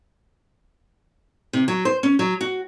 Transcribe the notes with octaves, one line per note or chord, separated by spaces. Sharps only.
C3
F#3
C5
C#4
F#3
F#4